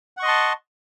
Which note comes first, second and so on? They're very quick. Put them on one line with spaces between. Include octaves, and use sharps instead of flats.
F#5 C#6 D#5 C6 A5